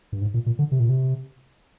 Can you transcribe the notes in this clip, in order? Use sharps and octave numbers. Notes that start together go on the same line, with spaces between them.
G2
G#2
A#2
A#2
D3
C3
A#2
C3